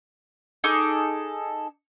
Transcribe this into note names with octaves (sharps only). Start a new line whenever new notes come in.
D#4 G#4 A4 D6